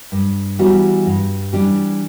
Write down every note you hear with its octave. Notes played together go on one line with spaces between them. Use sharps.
G2
E3 G3 B3 F#4
G2
E3 G3 D4 G4